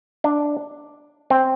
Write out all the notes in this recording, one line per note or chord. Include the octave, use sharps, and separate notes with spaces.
D4
C4